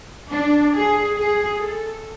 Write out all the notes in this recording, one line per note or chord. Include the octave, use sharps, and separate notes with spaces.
D4
G#4
G#4
A4